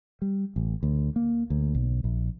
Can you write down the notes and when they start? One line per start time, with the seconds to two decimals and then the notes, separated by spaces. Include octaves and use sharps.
0.22 G3
0.56 A1
0.83 D2
1.16 A#3
1.50 D2
1.75 B1
2.04 A#1